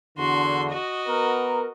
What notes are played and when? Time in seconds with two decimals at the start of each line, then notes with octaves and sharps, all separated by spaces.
0.18 E2 D3 F#4 C6
0.72 F#4 D#5
1.08 B3 A#4